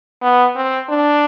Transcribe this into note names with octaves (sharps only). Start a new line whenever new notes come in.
B3
C4
D4